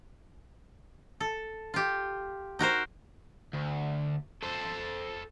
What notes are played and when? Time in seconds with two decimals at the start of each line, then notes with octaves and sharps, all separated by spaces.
1.20 A4
1.74 F4 G4
2.59 D#4 F#4 A#4 C5
3.54 D2
4.43 A4 C5